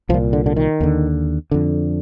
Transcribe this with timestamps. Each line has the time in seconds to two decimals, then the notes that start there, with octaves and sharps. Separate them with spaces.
0.09 C2 F3
0.14 A#2
0.33 D3
0.46 D3
0.56 D#3
0.81 D#2 D3
1.51 F2 D3